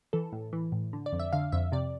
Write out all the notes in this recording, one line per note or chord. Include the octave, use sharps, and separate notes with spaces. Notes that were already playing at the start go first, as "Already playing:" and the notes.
E3 A4
A2
E3
A2
D3
D5
F2
E5
D3 F5
F2 E5
C3 D5